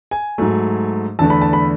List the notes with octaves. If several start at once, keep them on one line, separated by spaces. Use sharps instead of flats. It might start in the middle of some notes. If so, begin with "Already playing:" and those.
G#5
G#2 F#3 A3
E2 D3 A3 A5
B5
A5
B5